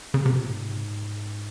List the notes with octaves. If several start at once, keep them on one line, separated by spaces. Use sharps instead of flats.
C#3
C3
A#2
G#2